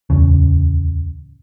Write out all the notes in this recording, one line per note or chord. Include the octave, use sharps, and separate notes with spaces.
D1 G1 E2 C#3